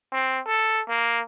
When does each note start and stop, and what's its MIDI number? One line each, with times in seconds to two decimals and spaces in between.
0.12 0.40 60
0.47 0.82 69
0.88 1.21 58